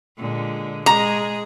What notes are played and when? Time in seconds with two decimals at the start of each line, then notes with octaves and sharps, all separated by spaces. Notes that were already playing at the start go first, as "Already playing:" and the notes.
0.17 A#2 D3 G#3
0.86 G#3 G#4 A#5